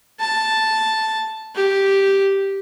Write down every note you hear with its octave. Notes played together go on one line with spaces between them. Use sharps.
A5
G4